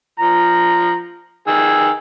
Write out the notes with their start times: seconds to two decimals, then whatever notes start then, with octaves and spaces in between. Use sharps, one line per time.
0.19 F3 A#5
1.47 D#3 G#4 E6